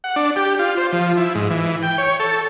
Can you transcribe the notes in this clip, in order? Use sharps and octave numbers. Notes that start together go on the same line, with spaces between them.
F#5
D4
G4
F4
C5
F3
E4
G#2
E3
G5
C#5
A4